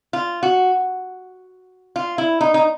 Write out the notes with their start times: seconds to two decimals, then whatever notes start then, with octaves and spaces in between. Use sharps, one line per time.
0.13 F4
0.43 F#4
1.96 F4
2.18 E4
2.41 D#4
2.54 D#4